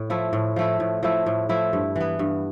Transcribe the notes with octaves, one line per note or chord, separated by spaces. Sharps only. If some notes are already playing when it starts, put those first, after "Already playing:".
Already playing: A2
F3 A3 E4
A2
F3 A3 E4
A2
F3 A3 E4
A2
F3 A3 E4
G2
E3 B3
G2